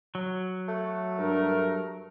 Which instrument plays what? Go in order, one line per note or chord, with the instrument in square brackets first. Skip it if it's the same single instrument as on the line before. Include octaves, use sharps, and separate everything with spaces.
[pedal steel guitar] F#3
[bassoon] A3
[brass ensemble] G2 A#4